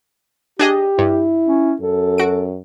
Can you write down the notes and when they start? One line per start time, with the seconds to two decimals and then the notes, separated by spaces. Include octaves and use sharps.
0.59 D4 G4 G#4 D#5
0.98 G2 E4
1.45 C#4
1.80 F#2 A4
2.18 F#4 D7